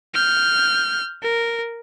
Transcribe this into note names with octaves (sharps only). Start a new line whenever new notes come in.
F6 G6
A#4